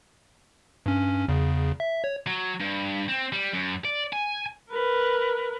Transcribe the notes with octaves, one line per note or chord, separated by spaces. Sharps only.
G2 C#4
E2 C#3
E5
C#5
F#3
G2
C4
G3
F#2
D5
G#5
A#4 B4